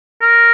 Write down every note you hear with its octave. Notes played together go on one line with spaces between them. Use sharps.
A#4